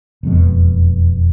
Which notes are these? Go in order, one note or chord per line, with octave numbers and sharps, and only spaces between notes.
E1 F2 B2